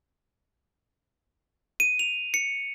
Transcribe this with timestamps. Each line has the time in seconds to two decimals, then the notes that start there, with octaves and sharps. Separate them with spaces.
1.80 D#7
1.99 F7
2.34 C#7